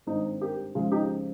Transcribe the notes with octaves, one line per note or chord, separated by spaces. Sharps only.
G#1 G2 G3 C4 D#4
G4 A#4
C#2 C#3 F3 F4 G#4
D#4 G4